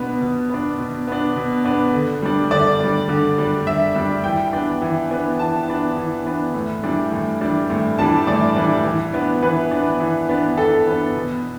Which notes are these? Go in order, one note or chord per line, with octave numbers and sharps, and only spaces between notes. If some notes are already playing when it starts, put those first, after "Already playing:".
Already playing: B2 B3 D4
B2
B3 D4
B2
B3 D4
B2
B3 D4
D3
G3 D4
D3 D5
G3 D4
D3
G3 D4
D3 E5
G3 D4
E3 G5
B3 D4
E3
B3 D4
E3 A5
B3 D4
E3
B3 D4
A2
E3 G3 D4
A2
E3 G3 D4
A2
E3 G3 D4 A5
A2 D5
E3 G3 D4
E3
B3 D4
E3 B4
B3 D4
E3
B3 D4
E3 A4
B3 D4
B2